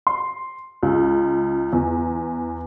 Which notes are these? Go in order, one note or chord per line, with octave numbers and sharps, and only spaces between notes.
C6
C#2
E2